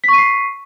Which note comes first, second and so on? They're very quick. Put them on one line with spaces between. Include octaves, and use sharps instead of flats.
B6 C#6 D#7 C7